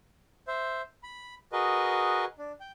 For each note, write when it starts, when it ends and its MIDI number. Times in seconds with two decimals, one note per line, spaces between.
0.48 0.82 72
0.48 0.82 76
1.03 1.35 83
1.52 2.25 66
1.52 2.25 68
1.52 2.25 70
1.52 2.25 71
1.52 2.25 75
2.39 2.52 62
2.60 2.72 79